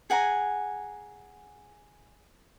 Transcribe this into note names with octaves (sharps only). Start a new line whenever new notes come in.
G#4 F#5 G#5 A#5